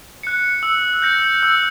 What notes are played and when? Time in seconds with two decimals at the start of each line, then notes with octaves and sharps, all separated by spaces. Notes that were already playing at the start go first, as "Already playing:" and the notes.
0.23 F#6 C#7
0.63 E6
1.02 G6 A#6 C#7
1.43 E6